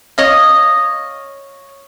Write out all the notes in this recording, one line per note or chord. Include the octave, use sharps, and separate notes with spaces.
C#5 D#5 F5